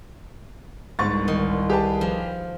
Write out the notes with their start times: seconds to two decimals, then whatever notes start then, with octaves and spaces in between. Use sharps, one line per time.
0.99 G1 C2 G#2 C#6 A6
1.28 D#3
1.70 G4 G#4 B4 A5
2.01 F3